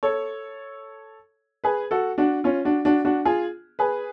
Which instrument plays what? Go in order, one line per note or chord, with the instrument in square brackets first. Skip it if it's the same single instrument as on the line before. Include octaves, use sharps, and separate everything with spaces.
[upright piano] A4 C#5
G#4 B4
F#4 A4
D4 F#4
C#4 F4
D4 F#4
D4 F#4
D4 F#4
F4 G#4
G#4 B4